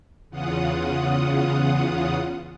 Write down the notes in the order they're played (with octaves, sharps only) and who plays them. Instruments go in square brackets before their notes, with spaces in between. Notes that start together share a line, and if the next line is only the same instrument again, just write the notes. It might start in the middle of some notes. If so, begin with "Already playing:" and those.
[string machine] E2 C#3 F4 F#5 D#6